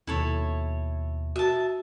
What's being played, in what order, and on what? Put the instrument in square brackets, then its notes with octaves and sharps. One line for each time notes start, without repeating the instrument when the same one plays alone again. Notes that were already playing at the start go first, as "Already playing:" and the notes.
[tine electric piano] D#2 B2 [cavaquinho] E4 A4 C#5
[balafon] F#4 [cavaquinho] E5 A5